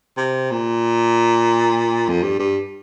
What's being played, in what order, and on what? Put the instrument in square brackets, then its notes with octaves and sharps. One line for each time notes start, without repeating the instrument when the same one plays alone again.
[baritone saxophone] C3
A#2
F2
G2
G2